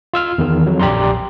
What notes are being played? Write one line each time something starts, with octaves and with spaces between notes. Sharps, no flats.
F4 E6 F6
E2 D#3
F2 F#3
A#1 G4 D5 A#5 C6